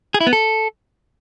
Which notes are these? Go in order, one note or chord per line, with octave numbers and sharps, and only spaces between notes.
G#4
E4
B3
A4